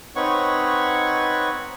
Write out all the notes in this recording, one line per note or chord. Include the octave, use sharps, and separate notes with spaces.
C4 D#4 B4 C#5 F#5 C#6